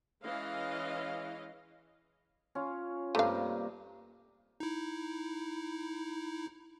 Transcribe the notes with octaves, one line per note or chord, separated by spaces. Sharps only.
E3 G#3 C#4 D#5 F5
C#4 F4
G2 C3 A3 A#3 F5
D#4 E4